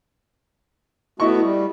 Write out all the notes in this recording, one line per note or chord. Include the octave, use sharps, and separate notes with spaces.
A3 B3 E4 F#4 D#5 C#6
G3